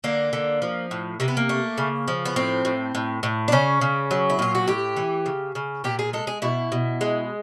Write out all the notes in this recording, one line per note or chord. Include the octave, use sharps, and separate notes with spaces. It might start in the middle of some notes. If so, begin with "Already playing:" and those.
D3 A#3
D3
F3
A2
C3 A#3
B3
A#3
A3
C#3
F3
B3
A2 C4
A2
A2
A2
D4
C#3 C#4
C#3
F#3
E4
A#2 F4
F#4
A2 G4
E3
C#3
C#3
A#2 G4
G#4
G#3 A4
G#4
B2 E4
B2
G#3